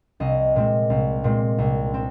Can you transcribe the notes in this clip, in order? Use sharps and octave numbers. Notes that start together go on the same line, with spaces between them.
C2 D#5
A#2 G#3 C4
C2
A#2 G#3 C4
C2
C4